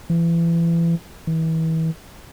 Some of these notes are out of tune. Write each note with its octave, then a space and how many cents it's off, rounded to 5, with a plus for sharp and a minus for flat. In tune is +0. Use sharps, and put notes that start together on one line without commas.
E3 +30
E3 -35